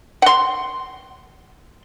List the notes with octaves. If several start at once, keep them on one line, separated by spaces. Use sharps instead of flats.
F#5 C6